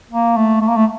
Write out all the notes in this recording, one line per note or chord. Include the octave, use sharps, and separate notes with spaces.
A#3
A3
A3
A#3
A3